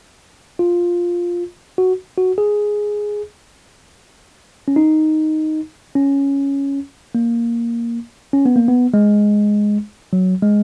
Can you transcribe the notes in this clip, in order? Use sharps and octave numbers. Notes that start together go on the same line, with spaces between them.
F4
F#4
F#4
G#4
C#4
D#4
C#4
A#3
C#4
B3
A#3
B3
G#3
F#3
G#3